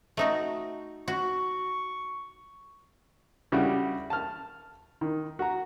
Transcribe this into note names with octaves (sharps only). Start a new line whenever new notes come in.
A3 D#4 F#4
F#4 C#6
C#3 G3 D4 E4 F#4
A5 F6
D#3
F#4 A#5